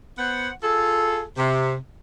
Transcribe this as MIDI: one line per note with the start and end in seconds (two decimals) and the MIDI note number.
0.18 0.50 59
0.18 0.50 72
0.18 0.50 78
0.62 1.23 65
0.62 1.23 68
0.62 1.23 69
1.37 1.75 48